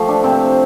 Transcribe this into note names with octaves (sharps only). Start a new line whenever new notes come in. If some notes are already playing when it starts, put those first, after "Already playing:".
Already playing: F3 A3 G4 A4
D4
C3 C4